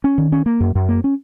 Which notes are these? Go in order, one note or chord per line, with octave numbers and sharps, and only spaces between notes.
C#4
D#3
C#4
A#3
F#2
F#2
A#3
C#4